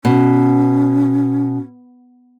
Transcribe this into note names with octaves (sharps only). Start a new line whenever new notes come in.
B2 C#4